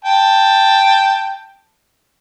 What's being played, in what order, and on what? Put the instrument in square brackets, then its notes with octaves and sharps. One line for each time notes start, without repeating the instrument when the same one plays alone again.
[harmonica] G5 A5